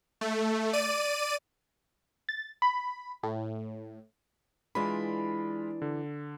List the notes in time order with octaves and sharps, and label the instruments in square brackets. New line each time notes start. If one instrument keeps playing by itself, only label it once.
[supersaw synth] A3
D5 D#7
[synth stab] A6
B5
A2
[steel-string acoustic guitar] E3 D4 [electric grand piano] G#3 F4 B5
[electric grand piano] D3